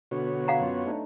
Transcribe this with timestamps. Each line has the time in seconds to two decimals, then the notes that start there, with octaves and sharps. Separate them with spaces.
0.11 B2 D3 B3 F#4 C#5
0.48 F5 F#5 A#5
0.61 F#2 F4
0.86 A3 D4 D#4